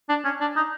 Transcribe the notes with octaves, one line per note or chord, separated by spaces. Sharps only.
D4
C#4
D4
D#4